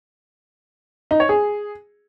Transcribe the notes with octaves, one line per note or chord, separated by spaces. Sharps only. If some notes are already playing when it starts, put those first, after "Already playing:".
D#4
C#5
G#4